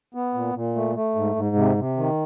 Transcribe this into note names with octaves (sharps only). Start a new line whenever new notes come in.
B3
A#2
A#2
A3
A3
G#2
G#2
C3
C3
D#3